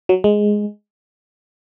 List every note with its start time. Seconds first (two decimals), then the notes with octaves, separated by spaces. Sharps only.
0.09 F#3
0.24 G#3